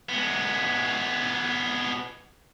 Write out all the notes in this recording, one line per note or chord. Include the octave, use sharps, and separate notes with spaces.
G#3 B3